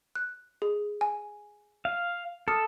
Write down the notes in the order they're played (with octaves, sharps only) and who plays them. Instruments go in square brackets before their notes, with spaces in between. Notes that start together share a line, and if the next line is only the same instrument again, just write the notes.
[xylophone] F#6
G#4
G#5
[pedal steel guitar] F5
[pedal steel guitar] A4 [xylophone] D6 D#6 F6